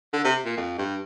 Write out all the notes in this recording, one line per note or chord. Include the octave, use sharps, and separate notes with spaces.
D3
C3
A#2
F2
G2